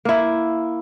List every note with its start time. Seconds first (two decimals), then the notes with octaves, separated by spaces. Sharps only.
0.05 A#3 E4